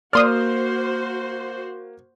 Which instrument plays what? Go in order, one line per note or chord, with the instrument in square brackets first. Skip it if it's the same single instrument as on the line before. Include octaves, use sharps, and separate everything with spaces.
[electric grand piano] A#3 F6 [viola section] F#4 C5 [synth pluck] D5 C6 D#6